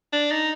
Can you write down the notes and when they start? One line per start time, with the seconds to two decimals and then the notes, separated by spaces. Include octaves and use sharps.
0.13 D4
0.31 D#4